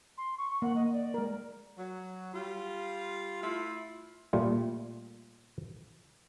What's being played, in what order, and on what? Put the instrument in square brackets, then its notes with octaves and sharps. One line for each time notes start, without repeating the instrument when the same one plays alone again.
[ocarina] C6
C#6
[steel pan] A#3 [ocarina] F#5
[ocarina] D#5
D5
[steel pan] G#3 A#4
[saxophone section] F#3
G3 F4
A3 E4 F4
[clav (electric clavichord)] A#2 G3 A3 F4